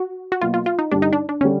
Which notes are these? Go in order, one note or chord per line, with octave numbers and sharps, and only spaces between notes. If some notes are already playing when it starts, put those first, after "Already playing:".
Already playing: F#4
F#4
B2 F#3 A#3 F4
F4
F4
D#4
G2 D3 G3 D4
D#4
D4
D4
D3 G3 C#4